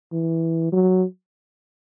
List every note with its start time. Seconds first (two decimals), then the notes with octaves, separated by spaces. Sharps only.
0.13 E3
0.73 F#3